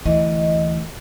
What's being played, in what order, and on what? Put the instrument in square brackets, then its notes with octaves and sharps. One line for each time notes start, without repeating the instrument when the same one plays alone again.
[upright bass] D2 E3 [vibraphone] D#5